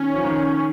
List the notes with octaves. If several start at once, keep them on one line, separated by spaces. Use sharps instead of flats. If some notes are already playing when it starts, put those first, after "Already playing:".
Already playing: D#3 C#4
F3
D#3